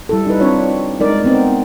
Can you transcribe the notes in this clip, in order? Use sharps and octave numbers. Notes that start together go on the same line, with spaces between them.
G3 E4 A4
D#4 B4
C4 D4 F4 C#5
G#3 D#4 A#4 D5
B3 C4 D#4